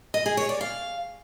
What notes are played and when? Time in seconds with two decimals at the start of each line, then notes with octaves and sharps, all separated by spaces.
0.14 D#5
0.26 G#4
0.37 C#5
0.49 D5
0.61 F5